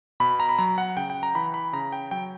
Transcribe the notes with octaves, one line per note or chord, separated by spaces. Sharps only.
B2 B5
A#5
B5
F#3 A#5
F#5
C#3 G5
G5
A#5
E3 B5
B5
C#3 A#5
G5
F#3 G5